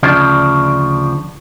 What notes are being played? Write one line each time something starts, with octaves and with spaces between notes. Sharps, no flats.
D2 C#3 F3 D4